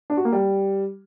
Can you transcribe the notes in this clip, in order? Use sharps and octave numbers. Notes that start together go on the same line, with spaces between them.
D4
F#4
A#3
G3